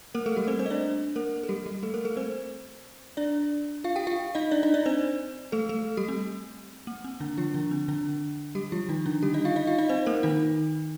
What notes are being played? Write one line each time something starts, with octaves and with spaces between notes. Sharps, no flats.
A#3 A#4
A3 A4
G3 G4
C4 C5
C4 C5
D#5
D4 D5
A#3 A#4
A4
G3 G4
G3 G4
A3 A4
A#3 A#4
A3 A4
C4 C5
D4 D5
F4 F5
G4 G5
F4 F5
D#4 D#5
D4 D5
D#4 D#5
D4 D5
C4 C5
A3 A4
A3 A4
G3 G4
C4
A#3
C4
D3 D4
F3 F4
D3 D4
C4
D3 D4
G3 G4
F3 F4
D#3 D#4
D3 D4
G3 G4
D#4 D#5
F4 F5
D#4 D#5
F4 F5
D#4 D#5
C4 C5
A#3 A#4
D#3 D#4